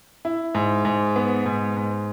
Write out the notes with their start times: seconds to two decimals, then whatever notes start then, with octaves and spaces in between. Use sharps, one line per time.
0.25 E4
0.55 G#2
0.85 G#2
1.16 B3
1.46 G#2
1.76 G#2